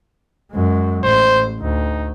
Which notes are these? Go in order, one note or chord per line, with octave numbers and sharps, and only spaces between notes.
F#2 G#3
A1 C5
D2 D#4